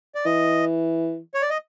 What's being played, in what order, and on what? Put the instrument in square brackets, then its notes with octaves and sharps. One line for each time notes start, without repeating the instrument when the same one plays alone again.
[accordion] D5
[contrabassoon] E3 [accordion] D#5
[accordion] C#5
D5
D#5